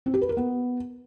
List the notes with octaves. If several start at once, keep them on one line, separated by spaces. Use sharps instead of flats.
C4
G4
B4
A#4
B3